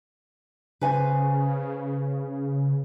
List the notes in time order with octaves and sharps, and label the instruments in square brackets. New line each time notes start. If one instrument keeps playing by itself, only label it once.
[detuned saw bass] C#3 [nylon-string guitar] B4 C5 G#5